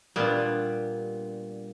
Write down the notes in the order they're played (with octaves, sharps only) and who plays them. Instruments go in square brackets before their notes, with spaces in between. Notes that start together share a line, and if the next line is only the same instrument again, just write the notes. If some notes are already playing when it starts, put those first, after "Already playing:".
[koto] A#2 B3 [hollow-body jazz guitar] G3 D4